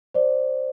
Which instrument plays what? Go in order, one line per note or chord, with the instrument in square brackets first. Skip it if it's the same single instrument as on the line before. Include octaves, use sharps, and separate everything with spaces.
[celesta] C5 D5